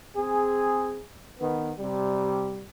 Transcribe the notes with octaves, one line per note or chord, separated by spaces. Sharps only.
C4 G#4
D#3 B3
C3 G3